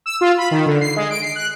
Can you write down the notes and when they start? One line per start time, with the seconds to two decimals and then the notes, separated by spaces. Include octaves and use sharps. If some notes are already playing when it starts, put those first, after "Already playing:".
0.06 E6
0.21 F4
0.38 B5
0.51 D#3
0.66 D3
0.81 C7
0.96 G#3
1.10 D7
1.22 C7
1.35 F#6